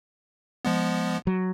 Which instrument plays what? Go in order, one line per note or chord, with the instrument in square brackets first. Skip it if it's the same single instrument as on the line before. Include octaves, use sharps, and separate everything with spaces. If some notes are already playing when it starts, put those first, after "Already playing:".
[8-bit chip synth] F3 G#3 B3
[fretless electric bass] F#3